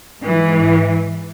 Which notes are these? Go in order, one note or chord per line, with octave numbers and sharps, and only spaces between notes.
G#2 E3